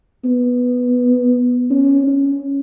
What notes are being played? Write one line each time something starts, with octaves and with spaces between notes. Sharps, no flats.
B3
C#4
C#4